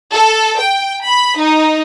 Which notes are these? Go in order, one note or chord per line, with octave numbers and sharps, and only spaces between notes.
A4
G5
B5
D#4